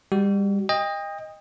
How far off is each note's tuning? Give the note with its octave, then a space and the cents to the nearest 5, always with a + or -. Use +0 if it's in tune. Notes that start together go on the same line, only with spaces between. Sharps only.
G3 +30 F#4 +45
D#5 +0 G5 +35